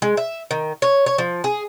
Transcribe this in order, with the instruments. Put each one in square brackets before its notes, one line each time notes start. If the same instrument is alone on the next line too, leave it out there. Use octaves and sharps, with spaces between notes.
[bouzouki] G#3
E5
D#3
C#5
C#5
F3
G#4